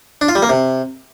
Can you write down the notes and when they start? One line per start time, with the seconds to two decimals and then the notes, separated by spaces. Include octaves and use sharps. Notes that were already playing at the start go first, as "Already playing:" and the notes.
0.21 D4
0.28 F4
0.35 G3
0.42 A#3
0.49 C3